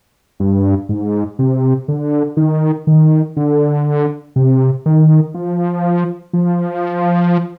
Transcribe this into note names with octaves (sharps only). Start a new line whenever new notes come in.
G2
G#2
C3
D3
D#3
D#3
D3
C3
D#3
F3
F3